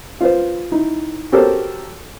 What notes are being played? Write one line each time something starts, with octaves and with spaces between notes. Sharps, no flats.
F4 B4 C5
D#4 E4
F#4 G4 A4 A#4 C5 C#5